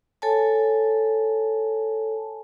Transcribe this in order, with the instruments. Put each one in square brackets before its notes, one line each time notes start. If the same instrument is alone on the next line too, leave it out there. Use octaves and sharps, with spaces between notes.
[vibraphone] A4 C#5 G#5 A5